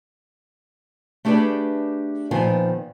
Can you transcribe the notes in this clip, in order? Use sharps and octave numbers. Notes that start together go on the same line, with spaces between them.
A3 D4 G4 G#4 B4 D5
A#2 D#3 F3 B3 F5 G#5